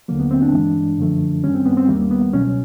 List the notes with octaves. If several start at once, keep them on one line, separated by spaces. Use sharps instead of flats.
D#2 D3 F#3 A#3
B3
C4
D4
G2 E3 G#3
F#2 D3 F3 A3
G2 D#3 G3 C#4
C4
B3
C4
D#2 D#3 G3 A#3
B3
C#2 B2 F#3 C#4